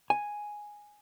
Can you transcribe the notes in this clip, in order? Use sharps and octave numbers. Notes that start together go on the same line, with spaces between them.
G#5